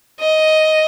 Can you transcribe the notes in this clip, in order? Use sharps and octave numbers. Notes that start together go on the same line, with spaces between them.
D#5